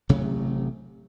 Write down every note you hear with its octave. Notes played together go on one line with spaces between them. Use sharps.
A1 C3 F#3 A3